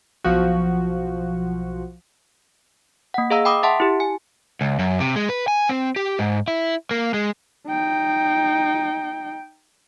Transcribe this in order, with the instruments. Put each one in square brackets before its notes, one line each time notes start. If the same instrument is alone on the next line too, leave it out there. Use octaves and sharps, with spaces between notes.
[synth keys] B1 F3 F#4
[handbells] A#3 F#5
G#4 D#5 F5 A#5 E6
G5 B5 D6 D#6
E5 F#5 A5 C6
E4 G4
G#5
[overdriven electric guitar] C#2
F#2
C3
G#3
B4
G#5
C4
G4
G#2
E4
A#3
G#3
[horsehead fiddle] D#4 G5